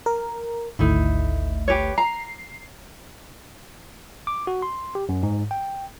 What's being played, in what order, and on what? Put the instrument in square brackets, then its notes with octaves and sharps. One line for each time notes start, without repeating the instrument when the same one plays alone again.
[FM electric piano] A#4
[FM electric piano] G#1 D2 A3 [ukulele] D#4 E4
[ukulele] G4 B4 C#5
[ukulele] A#5 [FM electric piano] C7
[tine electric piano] D6
F#4
C6
G4
F#2
G#2
G5